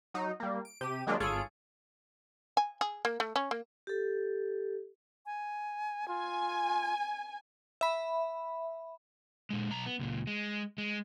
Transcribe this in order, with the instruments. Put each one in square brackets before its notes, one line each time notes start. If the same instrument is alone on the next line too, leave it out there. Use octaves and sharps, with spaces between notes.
[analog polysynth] F#3 D#4
G3 A#3
D7
C3 G4 D#7
D#3 F#3 G#3 A#3 D4 F4
G#1 F4 G#4 A4 C#5 D7
[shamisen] G#5
G#4
A#3
A3
C#4
A#3
[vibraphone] G4 A4
[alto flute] G#5
[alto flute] F4 [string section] G#5
[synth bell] E5 B5
[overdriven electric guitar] A#2 G#3
B1 A#5
B3
C#2 A#2
G#3
G#3